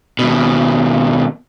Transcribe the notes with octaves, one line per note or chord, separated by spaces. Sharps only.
D#2 B2